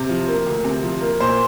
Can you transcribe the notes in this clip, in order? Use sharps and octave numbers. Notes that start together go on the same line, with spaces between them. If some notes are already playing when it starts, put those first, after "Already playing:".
Already playing: C3
F3
A#3
D2
C3
F3
A#3
A#2 C5